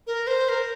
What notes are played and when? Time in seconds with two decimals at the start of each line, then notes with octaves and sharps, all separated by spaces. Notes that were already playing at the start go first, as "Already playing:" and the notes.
0.07 A#4
0.27 C5
0.49 A#4